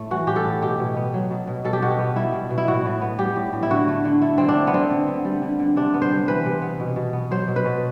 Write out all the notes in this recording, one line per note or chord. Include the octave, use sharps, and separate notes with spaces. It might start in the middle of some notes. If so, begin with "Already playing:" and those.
Already playing: A2 A3
E3 F#4
A2 G4
A4
A2
B2 G4
B2
B3
F#3
B2
B2
B2 A4
G4
B2 F#4
G4
B3
G3 E4
B2
B2
E4
A2 F#4
A2
B3
G3 G4
A2
A2
E4
D3 F#4
A3
D3
A3 E4
D3 C4
D4
A3
B3
D3 C4
D3
B3
G3
D3
D3
C3 D4
B3
C5
G3
E3 B4
C3
B3
B2
B2
B3
F#3 C5
B2
B4
B2